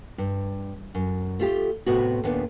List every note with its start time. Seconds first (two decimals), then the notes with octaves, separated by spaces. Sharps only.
0.18 G2
0.95 F#2
1.39 A3 F4 G4
1.86 A2 C3 B3 F#4
2.24 D#2 A#2 B3 D4